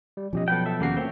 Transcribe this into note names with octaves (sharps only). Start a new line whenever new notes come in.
G3
B2 F3 C#4 G4 D#5
F#3 B3 A4 B4 G5
A4 E5
D#2 C#3 A#3 F#4 C7
A3 A#3 C4 C#5 E5 G5